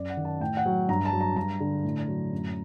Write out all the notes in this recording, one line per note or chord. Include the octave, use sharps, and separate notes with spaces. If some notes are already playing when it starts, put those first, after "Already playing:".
Already playing: F#2 D5
F#5
D#3
A5
A2 G5
F#5
F#3
G2 A#5
A5
F#3
A#5
G2 A#5
D3
A2
F#3
F#2